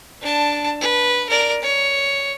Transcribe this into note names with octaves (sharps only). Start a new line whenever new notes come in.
D4 A5
B4
A#4 D5
C#5